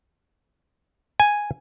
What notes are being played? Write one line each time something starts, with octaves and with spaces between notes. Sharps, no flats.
G#5